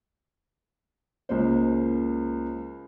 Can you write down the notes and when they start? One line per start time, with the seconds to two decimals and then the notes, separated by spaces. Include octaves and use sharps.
1.29 C#2 A#3 C5